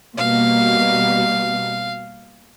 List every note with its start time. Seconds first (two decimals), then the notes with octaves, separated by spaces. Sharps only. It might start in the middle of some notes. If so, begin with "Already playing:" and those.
0.17 B2 G3 A#3 F5